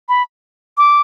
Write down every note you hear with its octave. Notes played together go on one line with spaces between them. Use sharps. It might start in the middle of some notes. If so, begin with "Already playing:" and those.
B5
D6